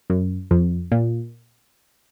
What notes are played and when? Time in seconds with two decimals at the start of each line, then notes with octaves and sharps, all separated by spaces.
0.10 F#2
0.51 F2
0.92 A#2